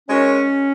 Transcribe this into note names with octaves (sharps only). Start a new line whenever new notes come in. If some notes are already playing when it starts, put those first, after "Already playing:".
G#3 C#4 D#4 F#4 A#4 C#5